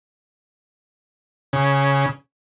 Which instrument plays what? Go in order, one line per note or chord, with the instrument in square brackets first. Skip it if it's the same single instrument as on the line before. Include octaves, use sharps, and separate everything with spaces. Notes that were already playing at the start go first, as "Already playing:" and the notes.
[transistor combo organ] C#3